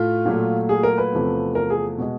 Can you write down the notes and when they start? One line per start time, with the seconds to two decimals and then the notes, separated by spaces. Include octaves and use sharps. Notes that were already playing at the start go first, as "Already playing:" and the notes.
Already playing: A2 A3 F4
0.25 A#2 F#3 A3
0.69 G#4
0.83 A#4
0.98 B4
1.12 E2 C3 F3 A3
1.55 A#4
1.70 G#4
1.98 B2 G#3